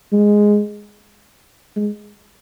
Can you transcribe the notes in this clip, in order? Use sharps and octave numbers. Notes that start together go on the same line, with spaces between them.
G#3
G#3